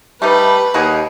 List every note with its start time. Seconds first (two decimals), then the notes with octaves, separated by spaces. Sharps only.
0.22 G3 A3 D#4 B4
0.74 D#2 F#4 G#4 D#5